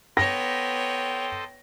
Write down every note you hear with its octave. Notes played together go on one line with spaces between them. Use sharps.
B3 A4 C5 C#5 D#5 G5 A#6